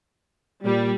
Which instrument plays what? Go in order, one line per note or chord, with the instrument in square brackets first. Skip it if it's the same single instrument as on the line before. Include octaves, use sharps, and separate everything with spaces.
[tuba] A#2 [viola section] G3